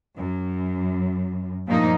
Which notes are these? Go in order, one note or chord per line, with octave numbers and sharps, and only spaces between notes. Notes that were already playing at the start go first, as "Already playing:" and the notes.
F#2
G2 A#2 F3 A#3 D#4